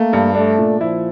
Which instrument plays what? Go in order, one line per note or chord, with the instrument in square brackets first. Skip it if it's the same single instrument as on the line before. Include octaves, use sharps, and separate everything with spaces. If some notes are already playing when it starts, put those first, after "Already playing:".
Already playing: [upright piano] A3 [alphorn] A#3
[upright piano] G2
[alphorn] A3 [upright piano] D4
[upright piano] A#2
[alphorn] F3 [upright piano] E4